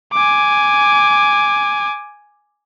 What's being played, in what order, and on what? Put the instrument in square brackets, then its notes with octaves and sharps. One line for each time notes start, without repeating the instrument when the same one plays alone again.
[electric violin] G#5 D6